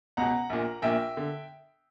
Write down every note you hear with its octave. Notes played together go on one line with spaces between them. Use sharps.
C#2 B2 F#5 A#5
A#1 A#2
A#1 A#2 E5 G5
D3